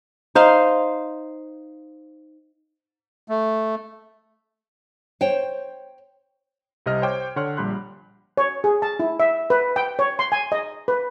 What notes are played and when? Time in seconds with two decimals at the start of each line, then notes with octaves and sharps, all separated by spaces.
0.35 D#4 C5 F5
3.28 A3
5.21 C5 C#5 G5
6.86 C2 C3 D#5 F6
7.02 C5 C#5 G5 D6 F6 G#6
7.36 D3 C#5 F#5 C6 F6
7.57 A#1 G3 G4 B5 C6 F#6
8.37 C#5
8.64 G#4
8.82 A5
9.00 E4
9.20 E5
9.50 B4
9.76 G5
9.99 C#5
10.19 C6
10.32 G#5
10.52 D#5
10.88 B4